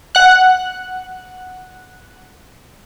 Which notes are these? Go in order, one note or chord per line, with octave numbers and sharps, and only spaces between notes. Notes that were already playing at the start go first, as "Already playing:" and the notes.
F#5 F#6